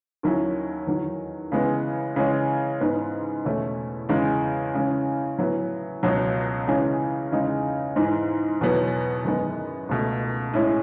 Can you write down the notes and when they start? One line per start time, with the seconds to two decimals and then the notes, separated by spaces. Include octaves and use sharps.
0.23 D#2 D#3 F#3 C#4 E4
0.87 E2 D#3 F#3
1.52 C#3 E3 G#3 B3
2.16 C#3 E3 G#3 C#4
2.81 G#2 E3 B3 D#4
3.45 E2 B2 A3 C#4 E4
4.09 E2 C#3 G#3
4.75 C#3 E3 G#3 C#4
5.39 A2 F#3 B3 E4
6.03 C#2 B2 F#3
6.68 C#3 E3 G#3 C#4
7.32 E2 C#3 G#3 D#4
7.96 G#2 E3 G#3 D#4
8.61 E2 B2 F#3 B3
9.25 F#2 D#3 G#3 B3 D#4
9.89 C#2 B2 A3
10.54 A2 G#3 C#4 E4